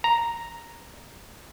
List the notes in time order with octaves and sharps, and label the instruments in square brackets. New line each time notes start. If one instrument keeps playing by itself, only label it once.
[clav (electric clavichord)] A#5